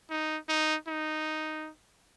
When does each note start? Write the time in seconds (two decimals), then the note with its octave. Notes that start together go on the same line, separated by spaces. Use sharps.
0.10 D#4
0.49 D#4
0.88 D#4